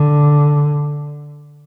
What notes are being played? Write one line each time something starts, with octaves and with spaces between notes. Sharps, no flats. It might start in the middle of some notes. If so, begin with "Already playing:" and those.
Already playing: D3